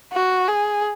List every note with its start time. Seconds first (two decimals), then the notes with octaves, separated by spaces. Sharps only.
0.13 F#4
0.48 G#4